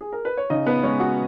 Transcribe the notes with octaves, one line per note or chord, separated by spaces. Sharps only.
G#4
A#4
B4
C#5
C#3 D#4 D#5
B3 B4
G#3 C#4 C#5
F#4 F#5